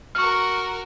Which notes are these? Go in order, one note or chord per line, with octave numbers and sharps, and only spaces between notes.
F#4 A#4 C#6 F6